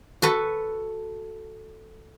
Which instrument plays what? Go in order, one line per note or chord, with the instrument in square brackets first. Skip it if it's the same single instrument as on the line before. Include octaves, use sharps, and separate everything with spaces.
[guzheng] F#4 A4 B4